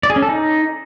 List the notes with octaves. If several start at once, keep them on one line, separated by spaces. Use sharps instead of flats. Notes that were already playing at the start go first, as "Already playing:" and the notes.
D5
G#4
C#4
A4
D#4